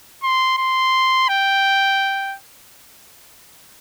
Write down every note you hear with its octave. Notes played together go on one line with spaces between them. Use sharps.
C6
C6
G5